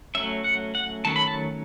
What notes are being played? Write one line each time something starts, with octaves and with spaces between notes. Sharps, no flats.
F#3 A3 C#4 E5
F#5
F#5
D#3 F#3 A3 C#4 A5
B5
A5